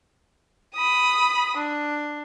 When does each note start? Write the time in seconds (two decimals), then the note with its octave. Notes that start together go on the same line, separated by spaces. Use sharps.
0.75 B5 D#6
1.58 D4